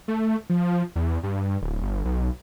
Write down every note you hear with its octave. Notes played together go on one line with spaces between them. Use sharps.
A3
F3
E2
G2
D1
G1
B1